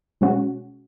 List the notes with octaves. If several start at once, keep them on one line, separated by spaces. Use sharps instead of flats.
B2 G#3 C#4 F#4